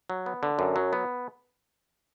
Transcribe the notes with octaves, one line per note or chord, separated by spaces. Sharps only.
F#3
B3
D3
F#2
F#3
B3